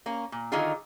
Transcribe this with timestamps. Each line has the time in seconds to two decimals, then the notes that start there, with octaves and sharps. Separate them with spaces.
0.06 A#3 C#4
0.32 A#2
0.52 D3 D#3 F#3 D#4 F4 G#4